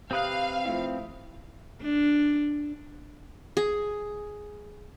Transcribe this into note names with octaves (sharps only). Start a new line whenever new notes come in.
C3 C4 B4 F5 D#6 F#6 F7
F3 A3 E4
D4
G#4